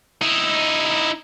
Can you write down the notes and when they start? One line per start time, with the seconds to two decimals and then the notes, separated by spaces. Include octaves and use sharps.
0.22 D#4 E4